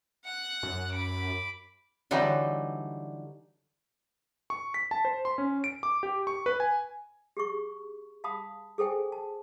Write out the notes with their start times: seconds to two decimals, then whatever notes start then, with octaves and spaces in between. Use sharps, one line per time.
0.24 F#5 F#6
0.63 F#2
0.93 B5 D6
2.11 D3 E3 F#3 G3 D#4
4.50 C#6
4.74 B6
4.91 A5
5.05 C5
5.25 C6
5.38 C#4
5.64 D7
5.83 D6
6.03 G4
6.27 C#6
6.46 B4
6.60 G#5
7.37 G4 G#4 C#6
8.24 F5 A5 B5 D#6
8.78 G#4 A4 C5 G5 G#5
9.12 A5